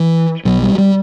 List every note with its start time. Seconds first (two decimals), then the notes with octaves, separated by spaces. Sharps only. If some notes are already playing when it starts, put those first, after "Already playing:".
Already playing: E3
0.45 B1 B2 F#3
0.63 G3
0.78 G3